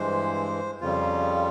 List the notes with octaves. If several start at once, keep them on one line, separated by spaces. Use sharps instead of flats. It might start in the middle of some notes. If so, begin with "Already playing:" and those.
Already playing: G2 E3 G#3 C5
F2 C#3 G3 F4